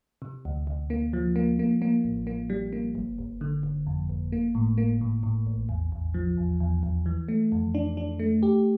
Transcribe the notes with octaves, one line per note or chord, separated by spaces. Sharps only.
C3
D2
D2
A#3
F3
A#3
A#3
A#3
A1
A#3
G3
A#3
G1
G1
D3
G1
F2
G1
A#3
A2
A#3
A2
A2
A1
E2
E2
F3
E2
E2
E2
E3
A3
F2
D4
D4
A3
G4